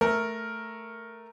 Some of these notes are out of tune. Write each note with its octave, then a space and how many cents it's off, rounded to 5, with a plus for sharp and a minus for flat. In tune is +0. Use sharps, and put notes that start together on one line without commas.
A3 +0 A#4 +0